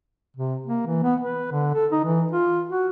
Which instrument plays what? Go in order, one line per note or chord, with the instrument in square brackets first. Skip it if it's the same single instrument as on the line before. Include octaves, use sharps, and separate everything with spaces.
[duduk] C3
A#3
E3
B3
B4
D3
A4
D#4
E3
F4
F#4